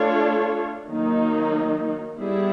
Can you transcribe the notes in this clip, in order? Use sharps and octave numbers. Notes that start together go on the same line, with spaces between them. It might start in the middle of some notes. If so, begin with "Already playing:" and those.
Already playing: A3 D4 F4 A4 C#5
D#3 F#3 A#3 D#4
G3 B3 E4 G#4